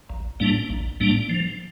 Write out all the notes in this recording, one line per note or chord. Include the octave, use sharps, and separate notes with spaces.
A#1
A2 G3 A#3 D4
A#1
A2 G3 A#3 D4
F3